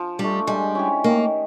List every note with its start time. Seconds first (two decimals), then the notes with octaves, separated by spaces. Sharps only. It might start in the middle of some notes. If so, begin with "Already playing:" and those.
Already playing: F3
0.19 G3 A3 D4
0.47 G3 G#3
0.75 C#4 E4 G4
1.04 D#3 A#3